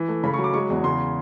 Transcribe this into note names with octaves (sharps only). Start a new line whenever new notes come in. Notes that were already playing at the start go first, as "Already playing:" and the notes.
Already playing: E3
A3
C#3 B5
C#6
F#3
D6
G#3 C#6
E2
C#3 C6